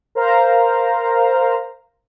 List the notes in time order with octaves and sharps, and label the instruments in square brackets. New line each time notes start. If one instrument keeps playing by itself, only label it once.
[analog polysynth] A#4 C5 F5 A#5